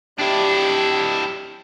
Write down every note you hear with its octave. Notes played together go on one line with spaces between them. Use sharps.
D4 E4 G4